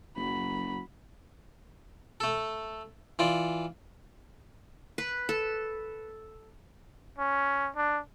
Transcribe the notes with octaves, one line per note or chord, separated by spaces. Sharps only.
F#1 F#3 B5
A3 A4
E3 F4 D5
B4
A4
C#4
D4